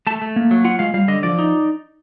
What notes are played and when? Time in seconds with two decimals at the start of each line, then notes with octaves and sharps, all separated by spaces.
0.07 A3 A5
0.22 A3
0.36 A#3
0.51 F#3
0.65 F4 F#5
0.79 G#3 F5
0.94 G3 F5
1.08 D3 D#5
1.23 F3 D5
1.38 D#4